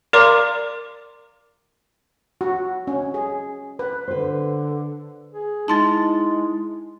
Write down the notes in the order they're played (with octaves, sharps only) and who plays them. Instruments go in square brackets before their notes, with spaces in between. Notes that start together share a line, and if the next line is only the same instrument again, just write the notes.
[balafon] A#4 D5 F5 A#5 C6 D6
[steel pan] F#4
C#4
G#4
B4
[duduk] D3 [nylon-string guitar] B4 C5
[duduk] G#4
[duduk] G#3 [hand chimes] D#4 E4 [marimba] A5 C6 A6